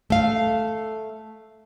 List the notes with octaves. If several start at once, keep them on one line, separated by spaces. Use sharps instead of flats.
A3 F5